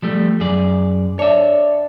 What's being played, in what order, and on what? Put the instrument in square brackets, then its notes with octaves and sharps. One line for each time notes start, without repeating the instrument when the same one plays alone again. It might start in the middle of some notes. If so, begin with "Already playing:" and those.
[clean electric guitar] F3 G3 A3
F#2 G#4 D5
[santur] D4 [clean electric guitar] C#5 E5